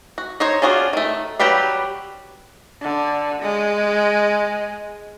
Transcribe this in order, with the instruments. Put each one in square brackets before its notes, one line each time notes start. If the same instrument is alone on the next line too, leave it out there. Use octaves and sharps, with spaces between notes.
[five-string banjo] F#4
D#4 C5 C#5
C#4 D4 F4 F#4 G#4
D#3 A3
F#3 G3 G4 B4 F5
[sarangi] D3
G#3